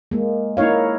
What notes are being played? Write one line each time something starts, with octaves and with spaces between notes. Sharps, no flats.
G#3 A#3
A#3 D#4 E4 C#5 F5